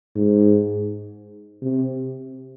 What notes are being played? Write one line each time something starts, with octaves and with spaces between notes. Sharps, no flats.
G#2
C3